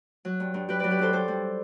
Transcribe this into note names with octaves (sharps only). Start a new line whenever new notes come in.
F#3
G2
G2
F#3 G4 B4
F#3 B4 D5
G4 B4
G2 A4 C5
G2 A4 C5
G3